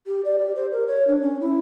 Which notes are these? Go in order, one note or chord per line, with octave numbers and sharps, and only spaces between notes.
G4
D5
G4
C5
A#4
C#5
D4
C#4
E4